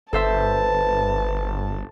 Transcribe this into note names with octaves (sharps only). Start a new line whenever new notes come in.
G1 A4 B4 C5 E5 A5